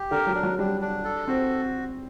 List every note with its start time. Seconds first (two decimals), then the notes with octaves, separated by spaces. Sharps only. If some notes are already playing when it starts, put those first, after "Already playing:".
Already playing: G4
0.11 D3 A#4
0.27 F#3
0.35 D4
0.43 F#3
0.58 G3 D4
0.81 D4
1.05 A4
1.28 C4 F#4